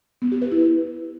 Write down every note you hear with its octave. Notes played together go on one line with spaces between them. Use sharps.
B3
G4
B4
E4
B4